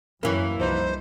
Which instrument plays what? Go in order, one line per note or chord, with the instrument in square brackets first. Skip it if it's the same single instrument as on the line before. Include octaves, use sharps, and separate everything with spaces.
[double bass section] F#2 [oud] E3 A#3 [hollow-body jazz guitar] C#4 C#5
[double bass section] C2 [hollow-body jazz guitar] F3 D#4 B4 [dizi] C5